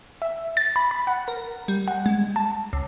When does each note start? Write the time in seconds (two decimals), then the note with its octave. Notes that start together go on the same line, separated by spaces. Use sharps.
0.22 E5
0.57 A6
0.76 B5
0.91 B5
1.07 F#5
1.28 A#4
1.68 G3
1.88 F#5
2.06 G#3
2.36 A5
2.73 C#2